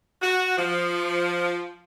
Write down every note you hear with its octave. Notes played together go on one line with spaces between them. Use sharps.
F#4
F3